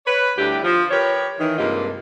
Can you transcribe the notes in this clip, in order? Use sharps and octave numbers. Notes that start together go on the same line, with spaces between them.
B4 C#5
D2 D3 G3 E4 G4
F3
G4 A#4 B4 C#5
D#3 E3
G2 C3 G#3 A#3 D#4 F4